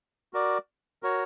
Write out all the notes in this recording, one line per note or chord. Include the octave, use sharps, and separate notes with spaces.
F#4 A#4 D5
F#4 A#4 C#5